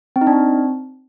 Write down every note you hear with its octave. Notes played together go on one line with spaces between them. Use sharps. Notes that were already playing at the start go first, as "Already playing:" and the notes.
C4
D#4
D4
C4